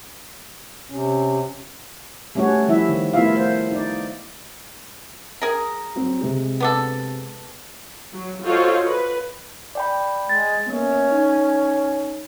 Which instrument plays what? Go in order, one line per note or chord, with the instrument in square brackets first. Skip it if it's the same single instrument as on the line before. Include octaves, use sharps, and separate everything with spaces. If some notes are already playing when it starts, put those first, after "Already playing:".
[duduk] C3 [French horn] C#4
[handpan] G3 A3 C#4 D4 F#4 C#5
F3 G3 E4 E5
D#3
A3 B3 E4 F4 E5 F5
C5
D#4 D5
[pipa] G#4 A#4
[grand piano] F#3 C4
C3 G#3
[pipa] B3 D4 A4
[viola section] F#3
F4 F#4 A4 C5 C#5 D#5
B4
[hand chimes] D5 G5 B5
[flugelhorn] G#3 [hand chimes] A6
[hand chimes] A#3 B3 [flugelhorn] C#4
[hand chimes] D#4